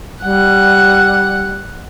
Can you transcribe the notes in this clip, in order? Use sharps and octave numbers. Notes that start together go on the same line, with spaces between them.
G3 F#5